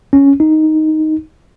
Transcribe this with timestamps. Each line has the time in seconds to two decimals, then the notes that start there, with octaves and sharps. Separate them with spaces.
0.13 C#4
0.40 D#4